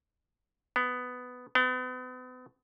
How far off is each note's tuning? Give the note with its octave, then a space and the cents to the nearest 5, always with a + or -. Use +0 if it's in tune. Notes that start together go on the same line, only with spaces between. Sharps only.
B3 +10
B3 +40